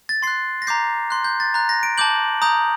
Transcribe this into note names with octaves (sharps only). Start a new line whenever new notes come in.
A6
C6 F#6 C7
A#6
A#5 D6 G6 C7
C6 F#6
G6
A6
A#5 F#6
A#6
D7
A5 D6 G6 F#7
A#5 D#6 G6